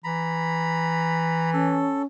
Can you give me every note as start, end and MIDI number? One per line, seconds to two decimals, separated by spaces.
0.04 1.93 52
0.04 1.50 82
0.04 1.50 83
1.53 2.05 61
1.53 2.02 69